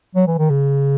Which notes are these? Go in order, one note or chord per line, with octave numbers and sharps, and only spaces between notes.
F#3
E3
D#3
C#3